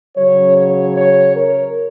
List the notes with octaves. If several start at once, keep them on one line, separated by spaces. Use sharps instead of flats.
C#3 F#3 C#5
C#5
C#5
A#4